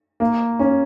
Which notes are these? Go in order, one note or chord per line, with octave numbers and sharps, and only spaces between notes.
A#3
C#4